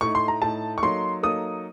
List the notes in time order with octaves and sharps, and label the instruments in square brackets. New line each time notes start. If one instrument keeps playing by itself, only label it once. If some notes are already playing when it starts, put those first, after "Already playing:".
[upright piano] A2 A3 D#4 [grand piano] C#6
[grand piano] C6
A#5
[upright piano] A2 A3 D#4 [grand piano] A5
[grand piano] C#6
[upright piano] F#3 A#3 D#4 A4 [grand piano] C6
[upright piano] F#3 A#3 D#4 A4 [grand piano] D#6